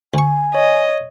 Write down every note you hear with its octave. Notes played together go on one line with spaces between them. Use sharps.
D2 G#5 C#6
C#5 D#5